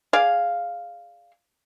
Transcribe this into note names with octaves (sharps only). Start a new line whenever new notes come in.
G#4 D5 F5